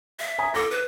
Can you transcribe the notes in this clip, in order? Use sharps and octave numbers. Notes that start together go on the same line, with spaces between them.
E5
G#5 A#5 D#6
A4 D6 A#6
B4